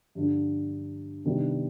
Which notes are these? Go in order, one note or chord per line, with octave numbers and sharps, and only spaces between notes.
G2 D3 F3
C3 D#3 G3 B3 D4